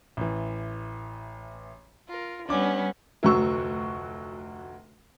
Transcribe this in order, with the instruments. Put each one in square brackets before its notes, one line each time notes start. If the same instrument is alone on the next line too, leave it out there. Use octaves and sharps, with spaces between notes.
[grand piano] A1 E3
[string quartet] F4 A#4
[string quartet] G3 B3 C#4 [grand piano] D4 D6
[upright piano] F1 D2 F#3 F#4 C#6 E6